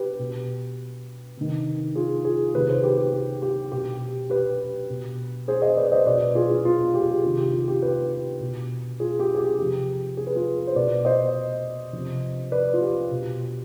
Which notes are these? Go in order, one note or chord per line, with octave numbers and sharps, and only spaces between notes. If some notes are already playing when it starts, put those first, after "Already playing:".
Already playing: G4 B4
B2
C3 D#3
F4 G#4
F4 G#4
C3 D#3 G4 B4
G#4 C5
G4 B4
G4
G4
G4
B2 G4
G4 B4
B2
G#4 C5
C5 D#5
B4 D5
C5 D#5
B2 B4 D5
F4 G#4
F4
F4
G4
G#4
G4
C3 D#3 F4
G4
F4
G4
G4 B4
B2
F4 G#4
G4
G#4
G4
C3 F3 G4
G#4
B4
F4 G#4
C5
B2 B4 D5
C5 D#5
C3 F3
B4 D5
F4
G4
B2